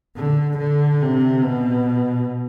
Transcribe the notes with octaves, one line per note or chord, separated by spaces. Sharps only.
D3
D3
C3
B2